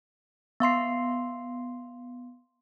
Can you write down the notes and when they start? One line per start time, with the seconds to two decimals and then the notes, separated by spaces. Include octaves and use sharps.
0.60 B3 F5 C6 C7